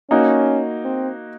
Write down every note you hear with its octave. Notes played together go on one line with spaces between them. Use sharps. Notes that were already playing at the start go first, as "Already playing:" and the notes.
A#3 C#4 D#4 F#4
C4